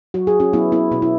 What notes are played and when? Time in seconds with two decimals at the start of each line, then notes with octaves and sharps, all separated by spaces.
0.14 F#3 F#4
0.27 G#4
0.40 C#4 F#4
0.53 F#3 B3 E4
0.72 B3 E4
0.91 B2 B3
1.02 E4